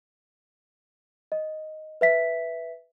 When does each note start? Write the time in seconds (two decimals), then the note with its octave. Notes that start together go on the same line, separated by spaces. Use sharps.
1.32 D#5
2.01 B4 E5 B6